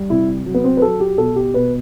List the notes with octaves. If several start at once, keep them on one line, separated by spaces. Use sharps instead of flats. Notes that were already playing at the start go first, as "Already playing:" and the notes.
Already playing: G3
C3 E4
F#3
B3
C4
B4
F#3 A4
G4
B2 A4
G4
B2 B4